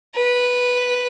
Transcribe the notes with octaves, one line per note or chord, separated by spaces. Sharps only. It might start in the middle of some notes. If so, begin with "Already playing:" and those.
B4